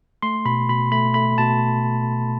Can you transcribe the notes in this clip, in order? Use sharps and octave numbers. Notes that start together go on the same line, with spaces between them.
A3 C6
B2 B5
B2 B5
A3 B5
A3 B5
B2 A5